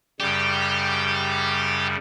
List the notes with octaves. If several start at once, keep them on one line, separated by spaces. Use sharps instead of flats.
F#2 C#3 G3 G4